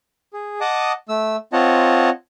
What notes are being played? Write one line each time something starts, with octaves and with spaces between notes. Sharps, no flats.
G#4
D#5 F#5 A5 D6 D#6
A3 E6
C4 F4 C#5 D#5 F#5 A5